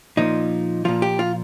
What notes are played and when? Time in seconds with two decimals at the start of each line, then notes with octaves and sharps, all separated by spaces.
0.17 A#2 F3 D#4
0.85 A#2 F3 F4
1.02 G4
1.19 F4